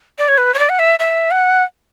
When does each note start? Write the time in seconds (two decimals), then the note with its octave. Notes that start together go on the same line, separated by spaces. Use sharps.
0.18 D5
0.28 C#5
0.38 B4
0.54 C#5
0.59 D5
0.69 F#5
0.79 E5
0.99 E5
1.31 F#5